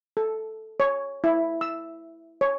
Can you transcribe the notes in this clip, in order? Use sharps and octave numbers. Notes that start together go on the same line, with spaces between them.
A4
C#5
E4
E6
C#5